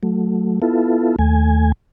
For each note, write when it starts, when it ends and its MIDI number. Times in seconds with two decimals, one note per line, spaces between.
0.03 0.60 54
0.03 0.60 57
0.62 1.16 59
0.62 1.16 64
0.62 1.16 65
0.62 1.16 69
1.19 1.72 39
1.19 1.72 57
1.19 1.72 80